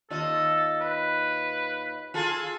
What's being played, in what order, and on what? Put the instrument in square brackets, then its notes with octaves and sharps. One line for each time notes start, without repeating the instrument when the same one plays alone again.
[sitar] D#2 F4 D#5 [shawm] A4
[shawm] B4
[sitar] F4 G#4 A4